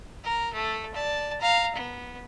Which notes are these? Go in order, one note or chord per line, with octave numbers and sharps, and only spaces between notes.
A#4
A3 A4
D5 A5
F5 A#5
B3